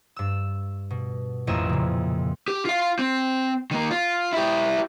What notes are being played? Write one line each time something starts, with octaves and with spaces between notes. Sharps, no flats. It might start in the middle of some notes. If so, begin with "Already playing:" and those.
G2 E6
B2
A1 F2 A#3 E4 D#5 E6
A#2 C#3
G4
F4 F5
C4
D#3 A#3
F4
E4 G4